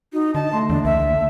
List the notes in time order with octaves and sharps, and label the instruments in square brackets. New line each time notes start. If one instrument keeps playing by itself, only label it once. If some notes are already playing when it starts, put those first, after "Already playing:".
[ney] D#4 [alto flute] F#4
[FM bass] D3 [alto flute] D#5 [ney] A5
[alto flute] A3 [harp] C6 A#6
[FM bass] E2 [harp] D3 A#3 [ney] D4
[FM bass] C#2 [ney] E5